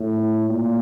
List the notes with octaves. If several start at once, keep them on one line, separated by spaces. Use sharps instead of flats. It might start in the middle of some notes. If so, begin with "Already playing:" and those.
Already playing: A2
A#2